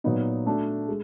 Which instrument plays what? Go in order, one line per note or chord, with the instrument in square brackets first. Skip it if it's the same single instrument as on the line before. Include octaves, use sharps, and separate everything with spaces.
[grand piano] A#2 F#3 B3 D#4
A3 D4 F#4
G#3